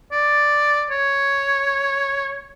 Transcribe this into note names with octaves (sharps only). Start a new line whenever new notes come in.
D5
C#5